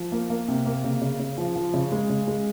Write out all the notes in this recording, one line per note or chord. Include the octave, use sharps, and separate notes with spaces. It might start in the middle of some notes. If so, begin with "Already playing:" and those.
Already playing: F3
A#3
A#3
C3
A#3
C#3
C#3
C#3
F3
F3
C#3
G#3
C#3
G#3